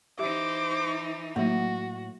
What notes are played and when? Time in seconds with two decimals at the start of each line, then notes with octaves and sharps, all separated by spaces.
0.19 E3 D#4 G4 C5 E5 D6
1.36 A2 F#3 A#3 F#4